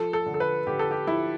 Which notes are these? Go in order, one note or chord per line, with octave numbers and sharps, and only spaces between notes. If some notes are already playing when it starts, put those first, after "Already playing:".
Already playing: F3 A4
A4
D3
A4
B4
D3 G4
A4
G4
F3 E4